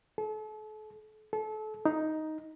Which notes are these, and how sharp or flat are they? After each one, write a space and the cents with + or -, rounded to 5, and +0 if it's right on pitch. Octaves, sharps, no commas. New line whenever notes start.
A4 -40
A4 -30
D#4 +5